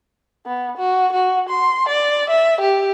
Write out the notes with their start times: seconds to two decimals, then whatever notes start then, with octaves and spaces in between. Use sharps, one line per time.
0.46 B3
0.77 F#4
1.12 F#4
1.49 C6
1.89 D5
2.30 E5
2.61 G4